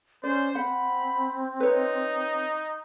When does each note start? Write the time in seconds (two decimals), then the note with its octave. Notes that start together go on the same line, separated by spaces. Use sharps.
0.24 C#4 C5 D5
0.55 C4 F#5 B5
1.60 D#4 B4 C#5